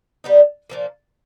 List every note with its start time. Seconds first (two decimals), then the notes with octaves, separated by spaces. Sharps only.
0.24 G3 B3 D#4
0.70 A#2 F3 A#3